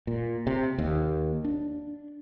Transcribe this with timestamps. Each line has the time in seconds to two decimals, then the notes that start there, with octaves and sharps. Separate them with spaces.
0.07 A#2
0.47 C3
0.78 D#2
1.44 D4